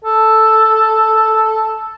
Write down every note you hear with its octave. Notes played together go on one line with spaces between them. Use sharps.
A4